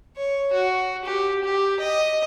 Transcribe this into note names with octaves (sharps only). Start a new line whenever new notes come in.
C#5
F#4
G4
G4
D#5